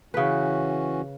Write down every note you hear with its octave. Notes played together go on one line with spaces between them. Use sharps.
C#3 E3 C#4 F#4 B4